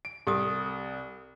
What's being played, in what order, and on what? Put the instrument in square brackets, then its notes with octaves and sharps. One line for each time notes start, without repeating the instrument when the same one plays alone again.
[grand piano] D7
[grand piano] C2 [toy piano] G4 A4 D#6